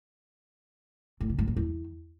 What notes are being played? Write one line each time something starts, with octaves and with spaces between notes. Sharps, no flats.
A2
C#3
G#2
A#2
E2